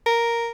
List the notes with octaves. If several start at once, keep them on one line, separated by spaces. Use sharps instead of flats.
A#4